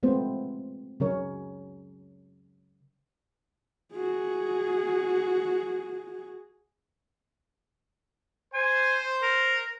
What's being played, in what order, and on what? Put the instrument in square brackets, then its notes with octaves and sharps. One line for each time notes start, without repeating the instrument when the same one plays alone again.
[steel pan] G#3 A3 B3 C4 F4 C5
C#3 F#3 C#4 A#4 C#5
[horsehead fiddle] F#4 G#4
[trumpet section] C5 [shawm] G#5
[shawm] A#4